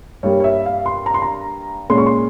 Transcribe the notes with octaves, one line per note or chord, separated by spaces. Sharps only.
G2 G3 A#3 C#5
C#5
E5
F5
C6
A#5
C6
A#5
A#2 G#3 C#4 C6
C#6
C6